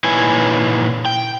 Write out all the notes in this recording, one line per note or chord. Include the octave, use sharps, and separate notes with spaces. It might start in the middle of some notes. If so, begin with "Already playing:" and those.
A#2 D#4 E4 B4 C#5 G#5
G5